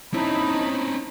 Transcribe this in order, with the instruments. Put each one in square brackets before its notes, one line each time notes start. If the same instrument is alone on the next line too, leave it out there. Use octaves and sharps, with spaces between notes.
[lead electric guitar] C4 C#4 [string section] D#4 A5 B5 [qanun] E4